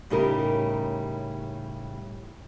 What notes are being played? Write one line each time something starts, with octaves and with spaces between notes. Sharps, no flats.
A2 C#3 G3 D#4 G4 A#4